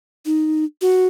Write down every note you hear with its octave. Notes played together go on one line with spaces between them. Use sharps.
D#4
F#4